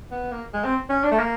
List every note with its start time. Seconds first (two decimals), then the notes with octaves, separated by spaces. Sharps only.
0.11 B3
0.32 A#3
0.54 G#3
0.65 C4
0.89 C#4
1.04 D4
1.11 A3
1.19 A#3